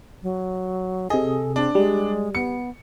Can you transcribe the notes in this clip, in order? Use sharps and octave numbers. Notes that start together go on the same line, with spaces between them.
F#3
C3 G#4 A4 D#5
C4 D4
G3 G#3
B3 C#7